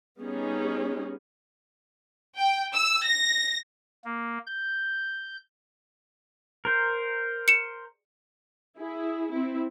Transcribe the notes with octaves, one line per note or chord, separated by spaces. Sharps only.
G3 B3 C#4 D#4 G#4
G5
E6
A#6
A#3
G6
A#4 C5
C#7 E7
E4 G#4
C4 E4